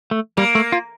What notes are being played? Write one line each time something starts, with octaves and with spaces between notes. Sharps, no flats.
A3
G3 A#3
A3
F4